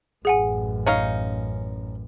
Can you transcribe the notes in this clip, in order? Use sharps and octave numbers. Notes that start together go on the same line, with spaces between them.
A1 F#2 G#4 F#5 G#5
C#4 D#4 F5